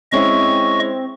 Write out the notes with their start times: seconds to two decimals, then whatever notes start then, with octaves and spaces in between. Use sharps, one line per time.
0.12 G#3 C4 C#4 E4 D#5 C#6